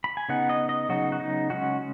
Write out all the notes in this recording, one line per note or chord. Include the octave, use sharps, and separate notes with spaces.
B5
G#5
C#3 B3 D#4 F#5
D#5
D#5
C#3 F#3 B3 D#4 F#4
F#4
D#4
C#3 G#3 C#4 F#4